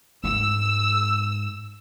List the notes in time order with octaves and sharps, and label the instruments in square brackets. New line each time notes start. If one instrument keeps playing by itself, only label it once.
[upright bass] G#2 [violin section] E6